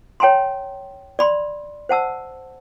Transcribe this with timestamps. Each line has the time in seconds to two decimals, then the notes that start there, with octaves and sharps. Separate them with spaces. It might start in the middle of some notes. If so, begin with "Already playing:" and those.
0.20 C#5 G5 G#5 A#5 C6
1.19 D5 B5 C6
1.89 C5 F#5 A5 E6